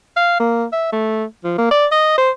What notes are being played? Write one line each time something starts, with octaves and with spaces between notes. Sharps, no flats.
F5
A#3
E5
A3
F3
A#3
D5
D#5
C5